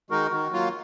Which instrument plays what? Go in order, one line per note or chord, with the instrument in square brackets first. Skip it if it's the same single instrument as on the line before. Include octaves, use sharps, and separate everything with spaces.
[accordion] D#3 G#3 D#4 [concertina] F#4 A#4
[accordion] D#3 [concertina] F#4
[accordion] F#3 A#3 F4